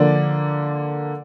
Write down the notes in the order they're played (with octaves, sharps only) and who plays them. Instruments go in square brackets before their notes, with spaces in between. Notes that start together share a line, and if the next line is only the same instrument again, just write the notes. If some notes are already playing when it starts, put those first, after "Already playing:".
Already playing: [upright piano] D3 F3 A#3 D5